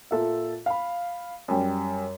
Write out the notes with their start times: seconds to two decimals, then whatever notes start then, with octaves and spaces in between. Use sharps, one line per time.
0.11 A#2 A4 E5
0.66 F5 B5
1.48 F#2 G3